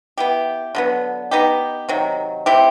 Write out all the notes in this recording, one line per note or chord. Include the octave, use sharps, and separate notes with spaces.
B3 E4 G4
D3 F#3 B3
B3 D#4 G4
C3 D#3 F#3
A3 C4 E4 G4